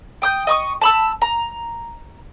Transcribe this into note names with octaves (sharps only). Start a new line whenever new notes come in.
G5 D#6 G6
D#5 C#6 D#6
A5 B5 E6
A#5